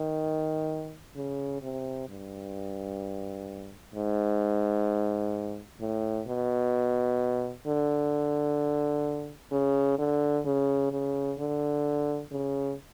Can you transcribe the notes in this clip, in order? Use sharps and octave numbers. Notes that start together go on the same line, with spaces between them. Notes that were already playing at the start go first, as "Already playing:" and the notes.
Already playing: D#3
C#3
C3
G2
G#2
A2
B2
D3
C#3
D3
C#3
C#3
D3
C#3